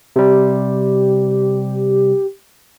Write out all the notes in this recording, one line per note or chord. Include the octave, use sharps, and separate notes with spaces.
C3 G3 G4